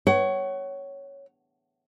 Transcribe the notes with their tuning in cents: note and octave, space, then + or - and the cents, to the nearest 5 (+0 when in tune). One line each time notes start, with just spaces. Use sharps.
C#5 +0 F#5 +35